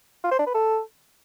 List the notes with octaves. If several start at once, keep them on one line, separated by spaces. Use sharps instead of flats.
F4
C5
D4
B4
A4